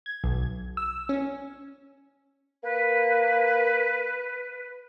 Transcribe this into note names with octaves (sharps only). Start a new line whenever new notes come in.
G#6
B1
E6
C#4
A#3 B4